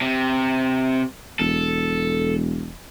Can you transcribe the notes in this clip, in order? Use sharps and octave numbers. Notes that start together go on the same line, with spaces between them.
C3
E1 A4